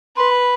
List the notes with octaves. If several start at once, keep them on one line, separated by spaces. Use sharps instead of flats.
B4 C6
B5